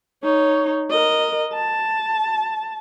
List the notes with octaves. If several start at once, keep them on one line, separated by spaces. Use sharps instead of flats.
D#4 C#5
A#4 D#5
A5